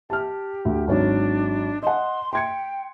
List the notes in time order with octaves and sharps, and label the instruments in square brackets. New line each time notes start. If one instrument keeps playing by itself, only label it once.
[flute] G4 [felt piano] A5 F6
[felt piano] D2
[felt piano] G#1 F#3 C#5 [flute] D4
[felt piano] D#5 F#5 [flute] C6
[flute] G5 [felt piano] C6 G#6 C#7